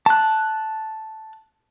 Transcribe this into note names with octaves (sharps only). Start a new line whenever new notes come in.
A5 F#6